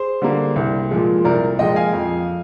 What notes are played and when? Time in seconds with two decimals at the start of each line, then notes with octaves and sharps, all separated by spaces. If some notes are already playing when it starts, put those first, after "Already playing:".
Already playing: G#4 C5
0.22 D3 G3 A#3
0.56 C2
0.90 A#2 F3 G#3
1.24 C2 A#4 D5
1.59 A#2 F3 G#3 D#5 G5
1.76 F5 G#5
1.93 F2